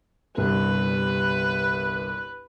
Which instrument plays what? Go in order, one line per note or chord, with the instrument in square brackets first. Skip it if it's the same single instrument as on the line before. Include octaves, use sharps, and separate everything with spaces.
[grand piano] G1 C2 G2 [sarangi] B4